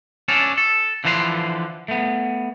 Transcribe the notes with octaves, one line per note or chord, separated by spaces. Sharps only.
C#4 D4 A4
A4
D3 E3 F3 B4 A5 C6
A3 B3